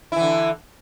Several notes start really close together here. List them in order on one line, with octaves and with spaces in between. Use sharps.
E4 E3 D3